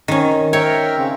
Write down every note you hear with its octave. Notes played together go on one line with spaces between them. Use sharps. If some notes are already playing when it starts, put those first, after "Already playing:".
D#3 C#4
A#4 C#5 E5 G5
C#3 C4